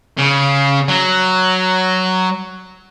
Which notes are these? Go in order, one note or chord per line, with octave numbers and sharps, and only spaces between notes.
C#3
F#3